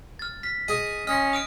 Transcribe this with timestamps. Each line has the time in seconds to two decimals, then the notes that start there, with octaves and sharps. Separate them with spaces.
0.19 F6 A6
0.43 F6 B6
0.68 G#4 D#5 D#7
1.07 C#4 D#5 C6 F6
1.33 D#6 F6 D7